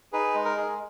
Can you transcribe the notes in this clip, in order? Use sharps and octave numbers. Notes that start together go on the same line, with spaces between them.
D#4 G#4 B4
G#3
A#4
G#4